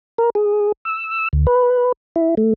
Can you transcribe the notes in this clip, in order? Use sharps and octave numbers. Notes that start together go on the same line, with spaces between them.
A#4
G#4
E6
D2
B4
E4
A3